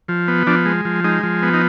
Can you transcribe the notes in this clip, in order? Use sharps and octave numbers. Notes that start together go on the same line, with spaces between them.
F3
B3
F3 D4
G#3
F3
G#3 D#4
F3
B3
D#4